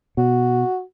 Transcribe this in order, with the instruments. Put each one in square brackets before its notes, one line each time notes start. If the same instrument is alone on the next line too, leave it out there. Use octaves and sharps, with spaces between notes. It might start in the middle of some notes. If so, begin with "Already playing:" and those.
[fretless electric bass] B2 [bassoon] F#4